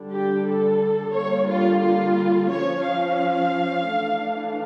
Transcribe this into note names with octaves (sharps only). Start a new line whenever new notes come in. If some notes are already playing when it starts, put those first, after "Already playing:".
Already playing: D3 G3 D4
G4
A4
D3 G3 A#3 C#5
F4
F4
F3 C#4 C#5
F5
E3 A3 D4